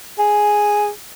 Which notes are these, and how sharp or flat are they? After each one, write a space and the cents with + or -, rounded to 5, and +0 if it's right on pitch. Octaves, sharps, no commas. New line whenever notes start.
G#4 +0